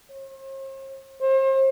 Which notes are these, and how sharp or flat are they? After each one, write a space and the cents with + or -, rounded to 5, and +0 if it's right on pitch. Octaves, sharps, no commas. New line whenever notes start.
C5 +45
C5 +40